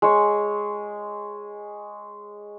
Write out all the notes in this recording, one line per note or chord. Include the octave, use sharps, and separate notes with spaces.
G#3 C#5